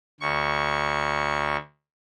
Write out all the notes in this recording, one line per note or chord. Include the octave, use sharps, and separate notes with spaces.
D2 C#6